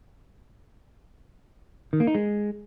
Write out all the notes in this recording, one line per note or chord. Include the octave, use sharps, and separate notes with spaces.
D#3
A#3
D#4
G#3